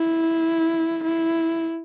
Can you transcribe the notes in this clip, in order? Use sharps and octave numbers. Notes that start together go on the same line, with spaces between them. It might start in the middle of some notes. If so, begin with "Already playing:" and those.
Already playing: E4
E4